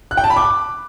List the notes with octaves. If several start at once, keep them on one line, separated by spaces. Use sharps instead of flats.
F#6
G5
A5
B5
D6